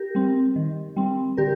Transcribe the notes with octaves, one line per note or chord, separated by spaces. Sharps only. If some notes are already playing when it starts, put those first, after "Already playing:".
Already playing: G4 A#4
G3 C4
D#3
G3 C4
D3 G4 A#4